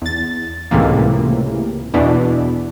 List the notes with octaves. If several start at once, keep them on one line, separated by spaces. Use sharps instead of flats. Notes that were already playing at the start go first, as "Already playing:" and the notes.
E2 A6
C#2 A2 C3 E3 A#3
E2 B2 E3 D4